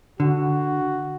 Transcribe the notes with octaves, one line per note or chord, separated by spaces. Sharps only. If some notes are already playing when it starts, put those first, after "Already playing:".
D3 F#4